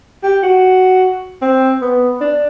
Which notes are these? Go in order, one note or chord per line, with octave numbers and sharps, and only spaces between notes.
G4
F#4
C4
B3
D4